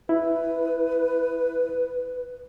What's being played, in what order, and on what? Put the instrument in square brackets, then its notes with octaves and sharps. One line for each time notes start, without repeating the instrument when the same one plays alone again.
[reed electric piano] E4 [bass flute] B4